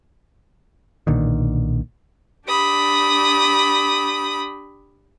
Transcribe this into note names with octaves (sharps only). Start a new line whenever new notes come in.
B1 A#2 D3 D#3
D4 G4 B5 D#6